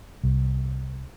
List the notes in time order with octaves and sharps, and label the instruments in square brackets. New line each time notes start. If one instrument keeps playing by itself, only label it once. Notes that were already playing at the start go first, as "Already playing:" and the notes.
[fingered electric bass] C2